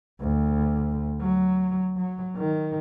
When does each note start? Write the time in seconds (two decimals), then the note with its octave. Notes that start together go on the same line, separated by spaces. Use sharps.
0.20 D2
1.21 F#3
1.97 F#3
2.36 D#3